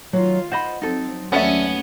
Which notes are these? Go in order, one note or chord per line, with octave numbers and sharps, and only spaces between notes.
D#3 F#3 F4
C5 D#5 F#5 B5
F#3 C4 D#4 A4
D#2 F#3 A3 B3 C#4 A4 D5 E5